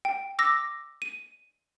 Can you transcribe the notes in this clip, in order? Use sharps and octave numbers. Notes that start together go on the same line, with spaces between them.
G5
D6 E6 A#6
D#7